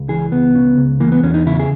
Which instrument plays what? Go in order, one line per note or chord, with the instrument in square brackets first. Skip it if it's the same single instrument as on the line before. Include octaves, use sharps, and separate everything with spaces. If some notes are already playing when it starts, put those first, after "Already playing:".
Already playing: [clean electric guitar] C#2
E3 G#4
C#2 B3
C#3
C#2
E3 A#3
B3
E2 C#4
D#4
C#3 E4
G#4